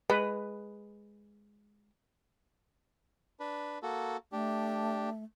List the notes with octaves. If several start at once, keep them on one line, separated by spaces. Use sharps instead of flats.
G#3 B4
D4 B4
A#3 F#4 A4
A3 D4 G4